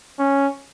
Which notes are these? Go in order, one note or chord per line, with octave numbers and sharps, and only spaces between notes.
C#4